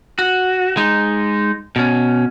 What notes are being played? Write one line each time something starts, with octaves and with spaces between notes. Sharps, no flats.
F#4
G#3 D#4
B2 C#4